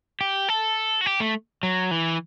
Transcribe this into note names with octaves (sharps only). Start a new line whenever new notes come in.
G4
A4
F#4
G4
A3
F#3
E3